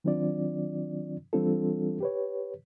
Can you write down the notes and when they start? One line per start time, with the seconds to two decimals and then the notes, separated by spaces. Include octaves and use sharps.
0.04 D#3 F#3 C4 D4 F4 D5
1.33 E3 G3 C4 D4 F4 A4
2.00 G4 B4 C#5